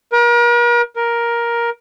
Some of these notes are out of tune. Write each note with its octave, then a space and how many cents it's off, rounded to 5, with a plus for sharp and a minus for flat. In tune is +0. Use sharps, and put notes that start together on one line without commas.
A#4 +40
A#4 +10